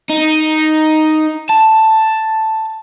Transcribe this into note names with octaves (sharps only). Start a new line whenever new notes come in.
D#4
A5